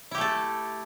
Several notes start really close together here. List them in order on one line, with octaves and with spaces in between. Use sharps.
E4 G4 A3 A4